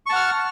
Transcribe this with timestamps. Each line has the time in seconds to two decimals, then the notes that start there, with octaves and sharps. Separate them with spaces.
0.06 C#6
0.09 A5
0.13 F#5
0.16 F6